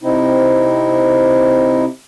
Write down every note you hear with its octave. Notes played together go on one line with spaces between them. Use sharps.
C3 C4 D#4 E4